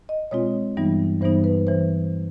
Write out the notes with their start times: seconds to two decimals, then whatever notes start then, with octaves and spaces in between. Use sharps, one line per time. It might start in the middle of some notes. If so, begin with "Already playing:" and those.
0.09 D#5
0.31 B2 G#3 C4 F4 C#5
0.77 G2 E3 G3 B3 D#4
1.21 G2 E3 G3 B3 D#4 C5
1.44 B4
1.67 E3 C5